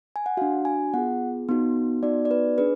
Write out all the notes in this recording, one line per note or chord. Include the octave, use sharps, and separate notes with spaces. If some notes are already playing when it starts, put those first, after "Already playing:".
G#5
F#5
D4 F#4 F5
G#5
B3 F4 G#4 F#5
B3 D#4 F#4
B3 D#4 F#4 D5
D5
B4
D4 G#4 B4